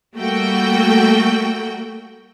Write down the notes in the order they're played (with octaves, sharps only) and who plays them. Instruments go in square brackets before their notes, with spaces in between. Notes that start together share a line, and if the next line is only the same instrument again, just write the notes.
[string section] G3 A3 A#3 F#4 G5